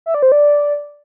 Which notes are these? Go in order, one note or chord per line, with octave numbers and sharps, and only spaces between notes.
E5
D5
C5
D5